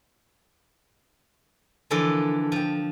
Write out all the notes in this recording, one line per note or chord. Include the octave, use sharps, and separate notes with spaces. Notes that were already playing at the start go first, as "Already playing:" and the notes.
D3 E3 F3 A4 A#4
F3 G5